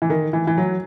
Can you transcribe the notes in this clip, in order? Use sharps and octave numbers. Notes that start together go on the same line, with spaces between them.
E3
D#3
E3
E3
F#3